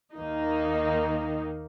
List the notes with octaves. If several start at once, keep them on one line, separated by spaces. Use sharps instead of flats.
D#2 D#3 A#3 D#4